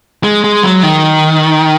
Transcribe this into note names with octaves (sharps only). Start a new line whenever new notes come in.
G#3
G#3
F#3
D#3